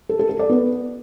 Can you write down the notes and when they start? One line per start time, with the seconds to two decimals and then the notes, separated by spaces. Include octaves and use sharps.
0.09 A4
0.19 A4
0.29 A4
0.39 D5
0.49 B3